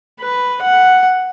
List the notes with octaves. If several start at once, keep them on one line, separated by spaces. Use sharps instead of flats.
B4
F#5